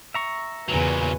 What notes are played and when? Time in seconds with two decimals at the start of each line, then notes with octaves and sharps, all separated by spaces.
0.14 E5 A#5 C#6
0.69 E2 A#2 C#3 F#3 B4 G#5